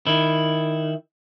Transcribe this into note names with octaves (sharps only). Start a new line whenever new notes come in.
D#3 E4